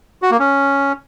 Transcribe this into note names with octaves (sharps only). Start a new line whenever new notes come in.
F#4
A#3
C#4